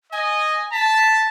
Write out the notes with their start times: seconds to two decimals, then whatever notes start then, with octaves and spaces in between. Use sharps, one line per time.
0.12 D#5 G#5
0.72 A5 B6